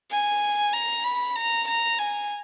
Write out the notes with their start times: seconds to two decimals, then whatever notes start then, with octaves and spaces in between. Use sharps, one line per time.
0.10 G#5
0.73 A#5
1.04 B5
1.35 A#5
1.66 A#5
1.98 G#5